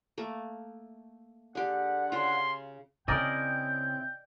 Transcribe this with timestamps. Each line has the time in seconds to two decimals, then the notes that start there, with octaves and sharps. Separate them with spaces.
0.18 A3 A#3
1.55 D3 G4 G#4 F#5
2.12 C#3 F4 C6
3.08 C#3 C4 E4 A#4 D5 D#5 G5